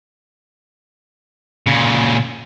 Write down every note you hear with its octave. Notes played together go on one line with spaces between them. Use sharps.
A#2 C#3